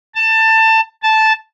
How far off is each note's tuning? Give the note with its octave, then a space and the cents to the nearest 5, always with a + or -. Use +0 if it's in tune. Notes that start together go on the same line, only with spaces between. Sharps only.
A5 +20
A5 -5